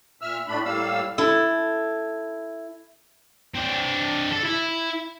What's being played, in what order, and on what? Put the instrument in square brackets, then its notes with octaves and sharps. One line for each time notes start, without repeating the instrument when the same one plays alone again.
[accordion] A#2 E5 E6 F6
A2 A3 D4 B5
A2 G3 A#3 F5 E6
[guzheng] E4 A4
[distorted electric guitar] C4 D4
A4
E4